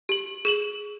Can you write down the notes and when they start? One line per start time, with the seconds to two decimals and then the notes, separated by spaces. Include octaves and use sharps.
0.09 G4 F#7
0.45 G#4 E7 F#7